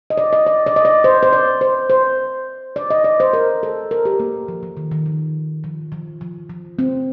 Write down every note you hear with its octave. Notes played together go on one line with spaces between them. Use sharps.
D#5
D5
D#5
D5
D5
D#5
D5
C5
C5
D5
C5
C5
D5
D#5
D5
C5
A#4
A4
A#4
G4
A#3
F3
F3
D#3
D#3
F3
F3
F3
F3
F3
C4